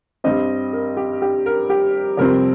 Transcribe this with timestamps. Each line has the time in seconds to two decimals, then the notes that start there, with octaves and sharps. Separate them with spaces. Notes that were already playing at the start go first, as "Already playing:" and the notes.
0.24 G2 G3 C4 D#5
0.73 A#4
0.97 G4
1.22 G4
1.46 A#4
1.70 G4
2.17 F2 C3 G3 C4 A#4